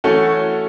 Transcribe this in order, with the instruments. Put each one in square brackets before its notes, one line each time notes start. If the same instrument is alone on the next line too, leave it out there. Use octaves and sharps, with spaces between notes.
[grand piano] E3 A3 C#4 F#4 A4